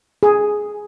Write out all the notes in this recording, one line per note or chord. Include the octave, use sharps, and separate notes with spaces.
G#4